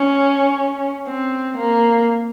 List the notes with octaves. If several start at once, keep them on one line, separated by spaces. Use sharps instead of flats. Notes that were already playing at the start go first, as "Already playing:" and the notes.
Already playing: C#4
C4
A#3